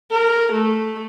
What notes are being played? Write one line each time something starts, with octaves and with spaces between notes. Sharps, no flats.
A#4
A3